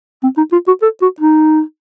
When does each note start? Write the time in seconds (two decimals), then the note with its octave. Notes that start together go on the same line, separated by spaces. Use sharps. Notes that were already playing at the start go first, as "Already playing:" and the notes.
0.23 C4
0.38 D#4
0.52 F4
0.68 F#4
0.82 A4
1.02 F#4
1.20 D#4